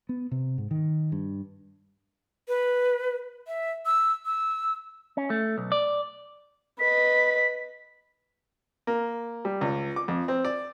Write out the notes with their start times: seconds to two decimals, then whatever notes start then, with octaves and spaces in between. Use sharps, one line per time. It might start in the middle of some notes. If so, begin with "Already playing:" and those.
0.09 B3
0.31 C3
0.58 G#2
0.71 D#3
1.12 G2
2.48 B4
3.47 E5
3.86 E6
4.26 E6
5.17 C#4
5.30 A3
5.58 B1
5.72 D5
6.80 B4 D#5 B6
8.87 A#3
9.45 G3
9.61 C#2
9.96 D6
10.08 F2
10.28 C4
10.45 D5